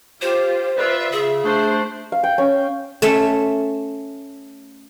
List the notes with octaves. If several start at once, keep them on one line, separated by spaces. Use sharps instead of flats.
F4 G4 C5
F4 B4 D5 E5
C#3 G#4
A3 D4 C5
F5
G5
C#4
A3 C#4 E5